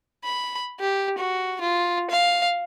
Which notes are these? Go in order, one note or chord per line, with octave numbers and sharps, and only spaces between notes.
B5
G4
F#4
F4
F5